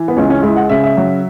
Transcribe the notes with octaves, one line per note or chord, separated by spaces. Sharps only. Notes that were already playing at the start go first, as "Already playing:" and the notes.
Already playing: E3
B3
C#2 C#4
C#4
G#3 E4
F#5
C#3 E5
E5
F#3